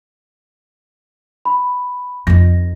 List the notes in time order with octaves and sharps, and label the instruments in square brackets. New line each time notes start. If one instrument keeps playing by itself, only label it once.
[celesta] B5
[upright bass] F2 D#4 [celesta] A#6